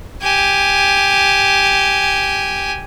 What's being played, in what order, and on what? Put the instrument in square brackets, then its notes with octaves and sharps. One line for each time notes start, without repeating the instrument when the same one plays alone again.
[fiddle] G4 G#5